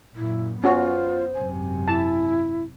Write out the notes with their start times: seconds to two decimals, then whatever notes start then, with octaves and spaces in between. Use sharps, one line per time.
0.16 F#2 A#2 E4
0.64 B3 C#4 F4 F#4 C5
1.35 G#1 F#2 C3 G#5
1.88 E4 A5